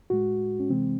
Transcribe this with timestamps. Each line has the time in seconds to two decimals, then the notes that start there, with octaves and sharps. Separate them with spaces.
0.10 A2 G#3 F#4
0.60 C#4
0.70 C3 E3 G#3 C4